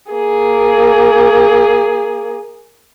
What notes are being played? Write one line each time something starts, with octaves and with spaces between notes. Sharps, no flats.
A#3 G#4